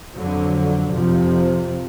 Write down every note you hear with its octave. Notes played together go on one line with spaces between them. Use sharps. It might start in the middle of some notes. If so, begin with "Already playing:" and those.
F2 D3 F#3
F2 C3 F3